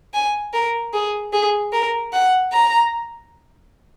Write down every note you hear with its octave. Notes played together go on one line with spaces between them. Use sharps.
G#5
A#4
G#4
G#4
A#4
F#5
A#5